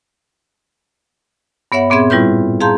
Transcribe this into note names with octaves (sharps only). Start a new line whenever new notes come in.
G2 B3 C#5 E5 F#5
A#2 B3 C4 G#4 E5 G#6
A2 G3 E4 F4 B4 G6
G#4 F5 A5 A#5 C6 G6